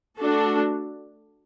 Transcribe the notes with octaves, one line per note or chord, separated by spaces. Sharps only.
A3 D4 F#4 A4